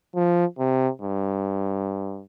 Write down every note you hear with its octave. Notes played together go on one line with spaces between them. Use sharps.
F3
C3
G2